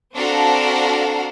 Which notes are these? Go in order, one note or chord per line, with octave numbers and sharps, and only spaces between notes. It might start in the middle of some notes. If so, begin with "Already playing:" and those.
C4 D4 F#4 A4 F5 A#5